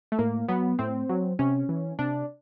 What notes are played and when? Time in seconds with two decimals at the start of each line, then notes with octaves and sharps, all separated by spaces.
0.12 A3
0.19 A2 A#3
0.48 F#3 B3
0.79 A2 C4
1.09 F#3
1.39 C3 C#4
1.69 E3
1.99 C3 D4